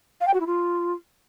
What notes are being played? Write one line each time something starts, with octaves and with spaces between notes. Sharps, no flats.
F5
G5
F#4
E4
F4